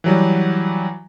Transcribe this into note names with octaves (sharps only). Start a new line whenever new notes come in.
E3 F#3 G3